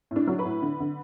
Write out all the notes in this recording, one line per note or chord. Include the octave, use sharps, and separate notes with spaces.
A2
D4
F#3
B4
A2
D3
D3